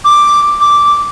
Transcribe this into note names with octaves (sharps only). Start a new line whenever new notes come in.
D6
D6